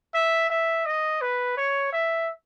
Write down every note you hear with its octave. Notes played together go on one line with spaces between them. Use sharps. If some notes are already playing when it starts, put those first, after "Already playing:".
E5
E5
D#5
B4
C#5
E5